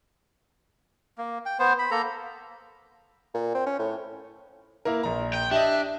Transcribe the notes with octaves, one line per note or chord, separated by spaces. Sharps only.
A#3
G5
B3 C5
B5
A#3 A4 A#5
A#2
C4
C#4
A2
A#3 E4 A#4
A#1 A#5
G5
D4 G4 D#5 E5